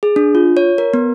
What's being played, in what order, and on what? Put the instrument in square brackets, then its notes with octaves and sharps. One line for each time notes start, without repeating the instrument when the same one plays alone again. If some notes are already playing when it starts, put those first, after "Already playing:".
[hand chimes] G#4
D4
F4
C#5
A#4
B3